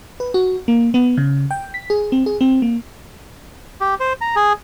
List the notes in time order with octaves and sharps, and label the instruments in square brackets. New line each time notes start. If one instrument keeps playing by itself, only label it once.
[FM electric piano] B4
F#4
A#3
B3
C#3
G5
B6
G#4
C4
G#4
C4
A#3
[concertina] G4
C5
A#5
G#4